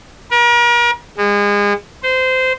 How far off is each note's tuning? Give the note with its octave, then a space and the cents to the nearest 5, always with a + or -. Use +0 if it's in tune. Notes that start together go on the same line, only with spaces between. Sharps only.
A#4 +40
G#3 -30
C5 -20